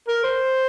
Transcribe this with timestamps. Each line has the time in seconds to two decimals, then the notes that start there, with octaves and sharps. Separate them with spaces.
0.08 A#4
0.24 C5